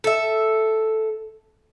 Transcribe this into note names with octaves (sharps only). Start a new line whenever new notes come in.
A4 E5